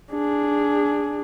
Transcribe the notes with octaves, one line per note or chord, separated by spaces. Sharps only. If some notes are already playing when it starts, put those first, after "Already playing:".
D4 G#4